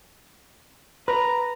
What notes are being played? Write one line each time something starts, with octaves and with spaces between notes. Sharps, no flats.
B4 A#5